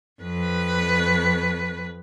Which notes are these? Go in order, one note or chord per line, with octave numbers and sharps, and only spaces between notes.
F2 B4